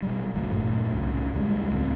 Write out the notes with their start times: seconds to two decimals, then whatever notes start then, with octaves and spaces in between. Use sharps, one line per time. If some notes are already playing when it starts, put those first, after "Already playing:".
0.02 B2 F#3 G3
0.34 G#1 D2 F#3 A3
0.51 G2 A#2 F#3 A3
0.93 C2 A2 C#3
1.33 D#2 C#3 G3 G#3
1.71 C#2 A2 A3 C4